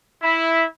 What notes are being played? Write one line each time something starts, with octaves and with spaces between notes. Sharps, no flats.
E4